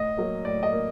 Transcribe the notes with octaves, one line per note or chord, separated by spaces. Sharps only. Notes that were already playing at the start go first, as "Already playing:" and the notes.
Already playing: A2 D#5
F#3 A#3
A2 D5
D#5
A#3